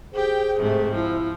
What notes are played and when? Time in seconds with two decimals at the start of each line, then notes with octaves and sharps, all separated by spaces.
0.13 G4 G#4 C5 G5
0.58 G#2 C3 A3
0.94 F3 E4